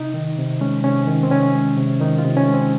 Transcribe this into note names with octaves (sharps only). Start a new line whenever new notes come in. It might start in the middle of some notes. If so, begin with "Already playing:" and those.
Already playing: C3 D#4
D#3
C3
G#3 C#4
C3 C#4
D#3
C4
C3 C#4
G#3
C3
D#3 D#4
F4
C3
C#4
G#3
C4